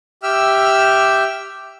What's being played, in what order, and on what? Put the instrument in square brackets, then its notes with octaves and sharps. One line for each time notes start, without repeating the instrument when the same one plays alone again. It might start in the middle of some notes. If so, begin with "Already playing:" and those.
[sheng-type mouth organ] G4 E5 G5 E6 F6